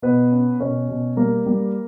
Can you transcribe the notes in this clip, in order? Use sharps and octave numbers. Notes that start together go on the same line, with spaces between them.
B2 B3 B4
C#4
B2 C#4 C#5
B2
G3 A#3 A#4
G3